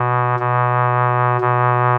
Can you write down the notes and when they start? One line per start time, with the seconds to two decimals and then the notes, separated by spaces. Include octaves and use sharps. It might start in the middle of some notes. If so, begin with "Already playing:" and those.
Already playing: B2
0.39 B2
1.41 B2